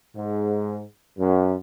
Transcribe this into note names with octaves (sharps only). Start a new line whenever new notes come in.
G#2
F#2